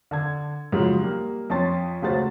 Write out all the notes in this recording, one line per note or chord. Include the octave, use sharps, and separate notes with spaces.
D3 A5 G#6
G#2 C#3 F3 F#3
G3 A#3
F2 C#4 A5 C6 A6
C#2 C#3 A3 F#4 C5 A6